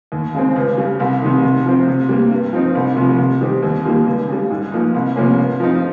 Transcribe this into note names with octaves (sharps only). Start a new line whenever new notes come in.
D#2
C#3 G#3 C4
C#2
C#3 G3
C2
C3 D#3
C3
F3 C4
C3
G3 A#3
G2
F3 C4 D#4
C2
C3 F3
C3
D#3 G3 C4 G4
D#2
D#3 G3 A#3 F4
C#2
C#3 G3
G#2
F3 A#3 D#4
C2
C3 F3 A#3 C#4
G2
F3 C4 D#4